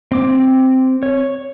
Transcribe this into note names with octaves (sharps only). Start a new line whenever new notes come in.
C4 D6
C#5